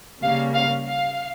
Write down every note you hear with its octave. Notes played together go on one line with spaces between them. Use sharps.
C#3 G3 A#3 C#4 F5
F5
F5